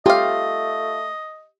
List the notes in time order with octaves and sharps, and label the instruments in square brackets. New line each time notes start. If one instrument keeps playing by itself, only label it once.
[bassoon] A3 [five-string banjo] F4 F5 [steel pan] G4 [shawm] D#5